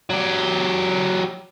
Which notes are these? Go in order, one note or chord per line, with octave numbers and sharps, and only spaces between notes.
F#3 G4